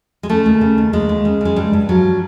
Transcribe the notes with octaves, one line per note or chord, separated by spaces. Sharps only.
G#3
C#3 A3
D#2
C#3
D#2
D#2 G#3
D#2
C#3
C#3 G#3
G2 G3
G2
F3 F#3